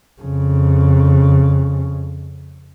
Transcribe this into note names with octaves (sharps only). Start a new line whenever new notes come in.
F2 C#3